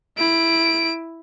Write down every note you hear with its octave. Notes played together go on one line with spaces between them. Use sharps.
E4 D7